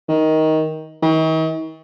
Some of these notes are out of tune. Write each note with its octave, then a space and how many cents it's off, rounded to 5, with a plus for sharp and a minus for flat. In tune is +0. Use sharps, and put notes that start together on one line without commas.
D#3 +15
D#3 +45